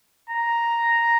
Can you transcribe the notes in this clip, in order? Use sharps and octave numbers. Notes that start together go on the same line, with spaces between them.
A#5